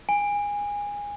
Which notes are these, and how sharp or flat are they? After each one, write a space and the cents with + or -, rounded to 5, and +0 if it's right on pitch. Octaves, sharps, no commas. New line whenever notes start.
G#5 -20